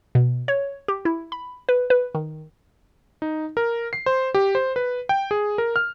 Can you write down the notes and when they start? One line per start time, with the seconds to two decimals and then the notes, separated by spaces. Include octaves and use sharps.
0.15 B2
0.48 C#5
0.88 G4
1.05 E4
1.32 B5
1.69 B4
1.90 B4
2.15 D#3
3.22 D#4
3.57 A#4
3.93 C7
4.06 C5
4.34 G4
4.55 C5
4.76 B4
5.09 G5
5.31 G#4
5.58 A#4
5.76 F6